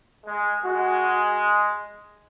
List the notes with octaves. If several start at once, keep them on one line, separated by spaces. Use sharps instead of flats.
G#3
G#3 F#4